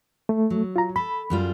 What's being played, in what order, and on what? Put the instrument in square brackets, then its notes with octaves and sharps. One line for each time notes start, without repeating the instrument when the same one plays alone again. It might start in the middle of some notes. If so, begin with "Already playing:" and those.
[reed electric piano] A3
[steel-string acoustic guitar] F#3
[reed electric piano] F4 A#5
[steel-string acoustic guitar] A4 [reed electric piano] B5
[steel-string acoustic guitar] F#2 G3 F4